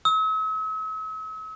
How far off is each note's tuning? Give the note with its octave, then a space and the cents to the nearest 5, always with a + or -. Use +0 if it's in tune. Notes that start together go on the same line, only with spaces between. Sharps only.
E6 -45